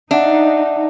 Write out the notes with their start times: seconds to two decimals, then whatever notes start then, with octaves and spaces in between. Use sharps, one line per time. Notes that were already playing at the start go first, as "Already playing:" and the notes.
0.11 D4 D#4 E5 F#5